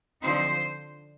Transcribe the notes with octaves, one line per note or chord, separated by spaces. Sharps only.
D3 F3 C4 D#4 C5